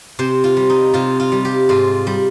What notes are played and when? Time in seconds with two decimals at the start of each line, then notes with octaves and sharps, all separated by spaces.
0.19 C3 C5
0.44 F4
0.57 G3
0.70 D#4
0.94 C3 F4
1.20 F4
1.32 G3
1.45 G4
1.69 G#2 F4
2.07 G3